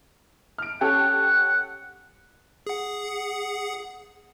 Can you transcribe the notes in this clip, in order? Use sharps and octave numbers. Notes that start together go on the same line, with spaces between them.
F6 D7
C#4 G4 A4 F#5
G#4 F#5